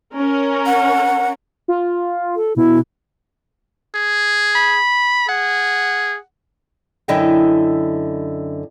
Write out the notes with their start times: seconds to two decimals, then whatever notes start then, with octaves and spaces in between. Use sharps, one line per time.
0.14 C#4 A#4
0.66 F#5
1.68 F4
2.36 A4
2.56 B2 E4
3.95 G#4
4.55 B5
5.28 G#4 F#5
7.08 F#2 D3 E4 D#5 E5 G5